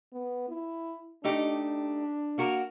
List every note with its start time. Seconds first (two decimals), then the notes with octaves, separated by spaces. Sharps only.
0.13 B3
0.49 E4
1.24 A3 D4 D#4 G4
2.38 A#3 F#4 A#4